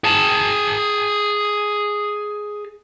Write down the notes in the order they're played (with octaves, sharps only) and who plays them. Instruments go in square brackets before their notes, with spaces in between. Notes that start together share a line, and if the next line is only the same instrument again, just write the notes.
[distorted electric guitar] G#4 A5